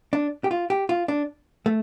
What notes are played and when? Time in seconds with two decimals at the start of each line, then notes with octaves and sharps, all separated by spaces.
0.13 D4
0.44 G4
0.51 F4
0.70 G4
0.89 F4
1.08 D4
1.66 A3